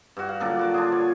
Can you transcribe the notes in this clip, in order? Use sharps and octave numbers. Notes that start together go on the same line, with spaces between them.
G2 F#4
F5
A#2 D3 F#3 D4
F#4 D6
D4 F4 G#4
C#5